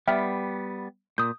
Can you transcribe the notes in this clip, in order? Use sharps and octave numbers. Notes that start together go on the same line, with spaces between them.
G3 B3 E5 G5 F6
A#2 D#6 G6